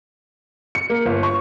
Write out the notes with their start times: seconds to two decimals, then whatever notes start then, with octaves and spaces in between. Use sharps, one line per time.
0.75 C#7
0.90 A#3
1.05 G1
1.23 C#6